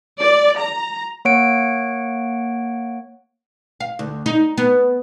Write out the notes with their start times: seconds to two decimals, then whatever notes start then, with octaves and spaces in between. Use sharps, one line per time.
0.19 D5
0.59 A#5
1.25 A#3 C#5 F#5 D7
3.80 F5
3.99 D2
4.26 D#4
4.58 B3